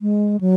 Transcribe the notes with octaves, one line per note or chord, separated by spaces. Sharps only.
G#3
F#3